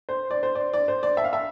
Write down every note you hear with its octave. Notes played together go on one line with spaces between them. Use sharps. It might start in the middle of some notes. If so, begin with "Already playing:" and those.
C5
D5
C5
D5
D5
C5
D5
E5
F5
E5